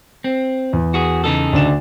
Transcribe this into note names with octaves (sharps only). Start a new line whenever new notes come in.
C4
E2
F#4 G#4
C#3 D#4 A4
D2 D4 E7